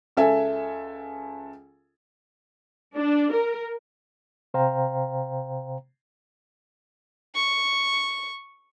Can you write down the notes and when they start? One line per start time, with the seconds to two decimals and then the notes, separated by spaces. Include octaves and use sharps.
0.17 C#2 A4 E5 G#5
2.97 D4
3.32 A#4
4.54 C3 C5 F5 G5 A#5
7.35 C#6